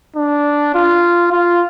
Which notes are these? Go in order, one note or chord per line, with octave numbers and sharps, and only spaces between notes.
D4
F4
F4